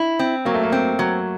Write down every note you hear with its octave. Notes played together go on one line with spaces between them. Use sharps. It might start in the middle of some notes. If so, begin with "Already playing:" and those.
Already playing: E4
C4
F#3 A#3
A3
A#3
C4
F#3